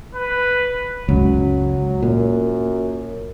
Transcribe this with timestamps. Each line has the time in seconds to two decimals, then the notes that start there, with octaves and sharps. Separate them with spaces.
0.15 B4
1.09 C#2 F#2 F#3
2.02 F#2 A#2